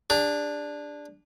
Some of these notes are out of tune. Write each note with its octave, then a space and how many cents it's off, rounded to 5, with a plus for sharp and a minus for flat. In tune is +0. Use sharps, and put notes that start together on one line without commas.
D4 +0 G#4 -40